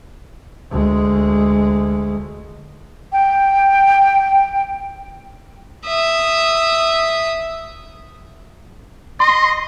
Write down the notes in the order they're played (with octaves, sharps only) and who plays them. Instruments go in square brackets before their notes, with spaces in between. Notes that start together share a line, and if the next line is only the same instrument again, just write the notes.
[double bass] D2 G#3
[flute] G5
[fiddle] E5 D#6
[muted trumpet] D#5 [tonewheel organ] C6